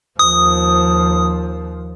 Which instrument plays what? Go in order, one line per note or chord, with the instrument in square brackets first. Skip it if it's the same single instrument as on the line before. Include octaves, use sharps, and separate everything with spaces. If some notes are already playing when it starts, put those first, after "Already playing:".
[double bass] D#2 F3 [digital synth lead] D#6